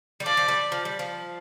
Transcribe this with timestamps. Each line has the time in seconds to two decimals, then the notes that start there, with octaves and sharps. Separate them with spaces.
0.20 G3
0.25 F3 D5
0.37 F3
0.48 G3
0.72 F3
0.85 G3
0.99 F3